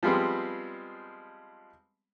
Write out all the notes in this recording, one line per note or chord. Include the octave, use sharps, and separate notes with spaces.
F3 G3 G#3 B3 C4